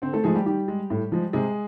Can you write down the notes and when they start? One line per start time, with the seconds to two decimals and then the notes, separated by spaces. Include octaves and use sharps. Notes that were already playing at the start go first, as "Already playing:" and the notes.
0.02 D3 C4 C5
0.13 A3 A4
0.24 F3 G#3 A3 G#4
0.35 G3 G4
0.46 D#3 G3 G4
0.68 G#3
0.90 A2
1.12 F3 G#3
1.33 C3 G#3 G#4